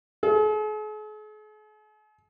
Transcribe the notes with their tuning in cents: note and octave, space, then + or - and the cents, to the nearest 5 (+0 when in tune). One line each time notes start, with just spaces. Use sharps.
G#4 +45